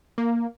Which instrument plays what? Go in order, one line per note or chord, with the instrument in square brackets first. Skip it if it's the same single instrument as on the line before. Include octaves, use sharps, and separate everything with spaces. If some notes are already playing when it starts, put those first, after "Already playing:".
[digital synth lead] A#3